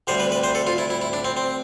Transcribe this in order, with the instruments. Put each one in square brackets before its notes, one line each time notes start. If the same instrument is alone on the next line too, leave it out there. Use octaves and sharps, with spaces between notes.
[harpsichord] D2 C3 G3 C5
B4
B4
C5
A4
F4
E4
E4
E4
D4
C4
C4